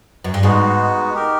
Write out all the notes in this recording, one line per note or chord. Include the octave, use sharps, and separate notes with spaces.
F#2
G2
G#2 G#3 B3 D#4 F#4
D#4 G4 A#4